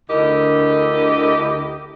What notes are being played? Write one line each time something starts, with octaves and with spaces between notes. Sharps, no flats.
D2 D3 E4 G4 A#4 D#5